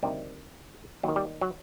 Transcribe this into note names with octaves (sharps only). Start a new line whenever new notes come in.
D2 C3 D#3 G3
D#2 D#3 F#3
G3
F#3